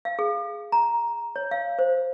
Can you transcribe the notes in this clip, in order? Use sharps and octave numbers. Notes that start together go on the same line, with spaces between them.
F5
G#4
A#5
C#5
F5
C5